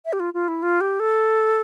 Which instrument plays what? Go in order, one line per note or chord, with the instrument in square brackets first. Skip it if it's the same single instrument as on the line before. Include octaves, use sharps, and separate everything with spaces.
[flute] E5
G4
F4
F4
E4
F4
G4
A4